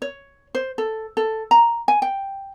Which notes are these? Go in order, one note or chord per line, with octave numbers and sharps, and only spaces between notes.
C#5
C5
A4
A4
A#5
G#5
G5